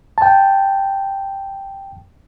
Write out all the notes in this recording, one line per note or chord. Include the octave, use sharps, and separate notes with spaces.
G5 A5